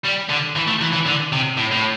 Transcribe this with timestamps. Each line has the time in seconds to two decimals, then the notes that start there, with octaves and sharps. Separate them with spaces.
0.05 G3
0.30 D3
0.56 E3
0.68 A3
0.82 E3
0.93 E3
1.06 D3
1.33 C3
1.57 A2
1.72 A2